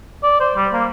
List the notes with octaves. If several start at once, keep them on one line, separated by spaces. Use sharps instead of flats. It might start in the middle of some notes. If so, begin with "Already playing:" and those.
D5
C5
G3
A#3